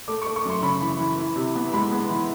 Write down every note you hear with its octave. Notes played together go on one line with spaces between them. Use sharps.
A3 D6
A3 C#6
C#6
F#2 C6
C#3 B5
E3
E3
E3
C3
B3
G#3 B5
B3
E3